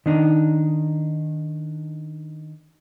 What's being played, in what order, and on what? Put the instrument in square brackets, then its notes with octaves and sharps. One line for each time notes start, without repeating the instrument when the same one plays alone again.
[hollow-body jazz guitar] D#3 D4 D#4